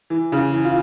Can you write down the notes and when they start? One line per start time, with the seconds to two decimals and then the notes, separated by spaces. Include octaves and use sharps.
0.10 E3
0.32 C#3
0.53 E3
0.65 F4